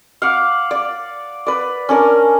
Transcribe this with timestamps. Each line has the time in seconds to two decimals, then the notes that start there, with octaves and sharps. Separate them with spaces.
0.22 F5 F#5 D6
0.71 D5
1.46 B4 D5
1.89 C#4 D4 A#4